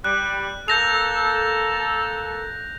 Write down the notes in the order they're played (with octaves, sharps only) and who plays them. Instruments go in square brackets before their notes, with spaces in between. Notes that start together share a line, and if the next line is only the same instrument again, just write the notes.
[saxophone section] G3 [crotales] F#6
[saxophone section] A#3 A4 [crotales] G6 A#6 F7